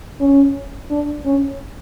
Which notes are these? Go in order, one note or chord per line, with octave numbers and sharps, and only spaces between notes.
C#4
D4
C#4